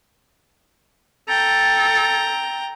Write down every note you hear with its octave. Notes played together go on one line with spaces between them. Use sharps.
A4 G5 A#5